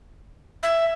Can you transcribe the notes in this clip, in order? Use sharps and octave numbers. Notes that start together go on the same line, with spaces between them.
E5